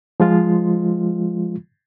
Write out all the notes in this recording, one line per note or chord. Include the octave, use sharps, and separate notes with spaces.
F3 G#3 F4